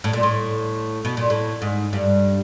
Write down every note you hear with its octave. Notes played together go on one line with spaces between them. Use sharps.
A2
A#2
A2
B2
A#2
A2
G#2
G2